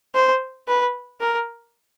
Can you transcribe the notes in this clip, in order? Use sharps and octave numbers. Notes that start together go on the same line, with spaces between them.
C5
B4
A#4